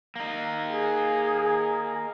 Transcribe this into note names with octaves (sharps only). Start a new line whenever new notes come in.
A#3 D#4
G#4